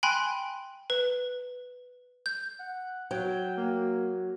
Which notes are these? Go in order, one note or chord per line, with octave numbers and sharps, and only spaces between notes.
G5 G#5 B5 C6 F#6
B4
G6
F#5
F#3 G5
A#3